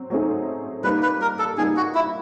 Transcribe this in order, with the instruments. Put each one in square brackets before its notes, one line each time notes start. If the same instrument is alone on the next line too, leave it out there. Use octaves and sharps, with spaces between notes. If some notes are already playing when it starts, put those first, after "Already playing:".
Already playing: [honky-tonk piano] F#3 C4
F#3 A3 C4 D#4 G#4
[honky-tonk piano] G3 A#3 D#4 [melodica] B4
[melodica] B4
A#4
A4
[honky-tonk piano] G3 A#3 D#4 [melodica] G#4
[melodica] F#4
E4